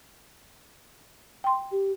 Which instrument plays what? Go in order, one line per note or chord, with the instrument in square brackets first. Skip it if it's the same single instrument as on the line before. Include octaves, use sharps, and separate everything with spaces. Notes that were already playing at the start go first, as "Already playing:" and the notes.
[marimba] G5 C6
[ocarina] G4